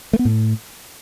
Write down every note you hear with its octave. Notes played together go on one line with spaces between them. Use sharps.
A3
B3
A2